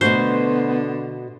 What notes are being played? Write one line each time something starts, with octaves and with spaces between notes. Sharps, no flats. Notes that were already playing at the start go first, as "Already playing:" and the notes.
B2 D3 A3 B3 F#4 C5